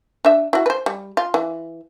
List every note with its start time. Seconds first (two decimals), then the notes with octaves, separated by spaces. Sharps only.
0.25 D4 E5
0.53 E4 F#4
0.66 B4 C5
0.86 G3
1.17 F4
1.34 E3